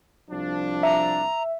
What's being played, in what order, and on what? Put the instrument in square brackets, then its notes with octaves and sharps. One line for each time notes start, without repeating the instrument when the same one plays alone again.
[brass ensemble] C2 F3 D4
[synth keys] E5 [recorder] A#5